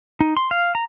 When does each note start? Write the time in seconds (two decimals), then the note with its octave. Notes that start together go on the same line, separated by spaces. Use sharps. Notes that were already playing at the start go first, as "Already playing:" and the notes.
0.21 D#4
0.37 C6
0.51 F5
0.75 A#5